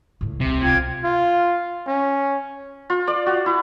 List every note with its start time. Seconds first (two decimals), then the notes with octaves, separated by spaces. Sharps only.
0.21 C#2 A2
0.41 D1 C2 C3
0.62 F4 G5 G#6
1.03 F4
1.87 C#4
2.90 F4
3.07 D5
3.26 F#4
3.46 E4